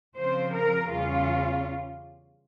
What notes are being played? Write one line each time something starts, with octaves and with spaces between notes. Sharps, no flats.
C#3 F3 C4 C5
A#4
E2 C#3 G3 C#4 F4